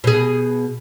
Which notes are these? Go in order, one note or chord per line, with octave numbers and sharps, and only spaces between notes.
B2 G#4